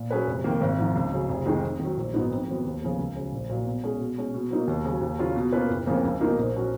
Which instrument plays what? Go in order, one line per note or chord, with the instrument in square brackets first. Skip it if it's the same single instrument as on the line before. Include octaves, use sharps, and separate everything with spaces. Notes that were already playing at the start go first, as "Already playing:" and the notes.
Already playing: [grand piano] A#2
F#3 C#4 G#4 B4
F1
F2 D#3 A#3
G#1
G#2 F3
C#2
C#3 F#3
F1
F2 D#3 G#3 D#4
F2
D#3 F#3
A#1
G#2 F#3 B3 D#4
F2
D#3 F#3 B3
D#2
C#3 F3 B3
C#2
C#3 F#3
A#1
A#2 F#3
B2
G#3 C#4 G#4
B2
G#3 C#4
B2
F#3 A#3 D#4
D#2
C#3 F#3
D#2
C#3 F#3 C#4 F4
B2
A#3 C#4 F4 B4
F#1
F2 C#3 F3 A#3
C#2
B2 A#3 D#4 A#4
A#1
F#3 C#4 F#4